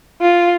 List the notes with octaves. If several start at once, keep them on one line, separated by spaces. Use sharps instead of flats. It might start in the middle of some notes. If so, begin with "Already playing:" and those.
F4